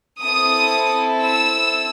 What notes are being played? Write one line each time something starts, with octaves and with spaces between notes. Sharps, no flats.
C4 E4 A4 D#6
E6